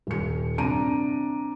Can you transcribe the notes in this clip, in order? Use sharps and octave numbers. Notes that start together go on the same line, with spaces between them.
D#1 C#7
C3 D4 A#5 D7 D#7